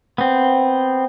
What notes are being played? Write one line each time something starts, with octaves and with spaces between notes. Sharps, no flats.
B3 C4